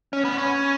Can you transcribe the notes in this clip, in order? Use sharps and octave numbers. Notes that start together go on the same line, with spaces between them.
C#4
B3
C#4